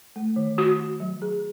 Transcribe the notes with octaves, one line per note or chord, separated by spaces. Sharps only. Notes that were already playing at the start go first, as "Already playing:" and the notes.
A3
D#3
F#4
F#4
F#3
G#4